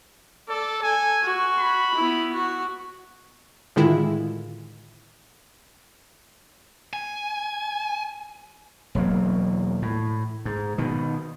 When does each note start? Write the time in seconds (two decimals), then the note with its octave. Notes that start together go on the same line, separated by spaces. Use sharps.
0.49 A4 D5
0.82 A4 G#5
1.23 F#4
1.59 B5
1.95 B3 E4
2.34 F#4
3.76 A2 D3 D#3 G#3 E4 F4
6.93 G#5
8.95 E1 F#3 A#3
9.82 A2
10.45 G#2
10.78 B2 D#3